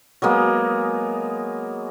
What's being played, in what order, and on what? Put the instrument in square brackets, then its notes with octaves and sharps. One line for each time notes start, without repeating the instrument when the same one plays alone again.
[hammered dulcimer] F#3 G#3 A#3 B3